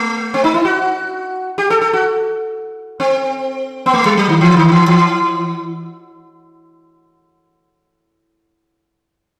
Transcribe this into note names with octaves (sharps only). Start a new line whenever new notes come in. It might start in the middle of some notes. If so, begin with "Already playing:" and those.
Already playing: A3
C4
D#4
E4
F#4
G4
A4
A4
F#4
C4
B3
A3
G3
F#3
D#3
E3
D#3
E3
E3